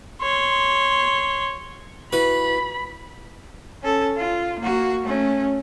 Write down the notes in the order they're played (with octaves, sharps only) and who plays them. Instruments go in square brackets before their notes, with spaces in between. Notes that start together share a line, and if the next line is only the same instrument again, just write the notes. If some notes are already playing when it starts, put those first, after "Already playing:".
[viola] C#5 C6
[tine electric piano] E4 F#4 [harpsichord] B4 [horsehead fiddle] B5
[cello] C#4 A4
F4
A#3 F#4
A3 C#4